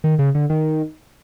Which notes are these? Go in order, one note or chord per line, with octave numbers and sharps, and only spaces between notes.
D#3
C#3
D3
D#3